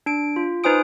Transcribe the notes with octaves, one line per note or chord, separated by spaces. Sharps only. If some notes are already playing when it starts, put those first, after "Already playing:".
D4 D7
F4
D#4 B4 C5 G#5 D#6 D7